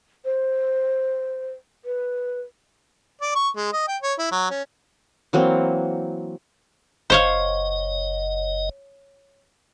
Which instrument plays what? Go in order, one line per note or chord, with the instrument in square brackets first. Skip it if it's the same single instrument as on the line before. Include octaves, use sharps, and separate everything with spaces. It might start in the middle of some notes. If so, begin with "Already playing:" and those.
[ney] C5
B4
[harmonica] D5
C#6
G#3
D#5
G5
C#5
E4
F#3
C#4
[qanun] E3 F#3 A#3 C4
[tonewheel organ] F#1 D#5 [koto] C5 C#5 F5